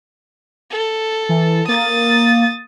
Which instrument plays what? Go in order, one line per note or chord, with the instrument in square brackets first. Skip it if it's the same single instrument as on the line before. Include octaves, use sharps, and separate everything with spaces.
[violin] A4
[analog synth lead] E3
[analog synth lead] A#3 [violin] D#6 A6